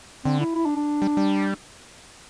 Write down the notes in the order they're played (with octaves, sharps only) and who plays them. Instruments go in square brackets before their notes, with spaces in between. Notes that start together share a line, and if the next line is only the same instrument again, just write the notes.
[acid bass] D3 [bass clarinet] C4
[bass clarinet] E4
E4
D4
D4
[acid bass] G3
G3